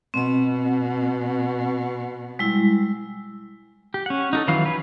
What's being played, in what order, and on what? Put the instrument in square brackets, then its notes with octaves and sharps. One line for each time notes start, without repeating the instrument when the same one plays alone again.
[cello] B2 [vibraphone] C4 D#5
[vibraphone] G3 G#3 E4
[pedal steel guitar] G4
C#4 F#5
D#4 F#4 A4
D#3 E3 F#3 F5
C#4 B4